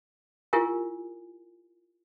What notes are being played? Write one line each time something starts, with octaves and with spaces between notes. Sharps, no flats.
E4 F4 G4 A#4 G#5